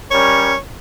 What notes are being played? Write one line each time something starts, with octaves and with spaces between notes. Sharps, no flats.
G3 C#4 A#4 C#5